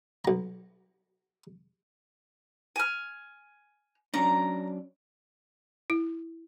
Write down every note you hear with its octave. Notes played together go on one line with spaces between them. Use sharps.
B1 A#5
G#5 F6
F#3 C#4 D4 A#5
E4